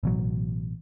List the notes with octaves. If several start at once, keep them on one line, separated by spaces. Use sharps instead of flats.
A1 B2 F#3